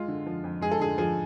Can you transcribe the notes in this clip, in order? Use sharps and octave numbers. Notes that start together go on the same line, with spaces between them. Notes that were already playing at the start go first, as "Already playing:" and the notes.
Already playing: G#3 F4
D3
F3
F2
G#3 G#4
A4
D3 G#4
F3 G#4